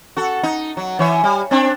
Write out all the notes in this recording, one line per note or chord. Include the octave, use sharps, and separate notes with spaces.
F#4 A4
D#4
F#3
E3 C#5 E5
G3
C4 D4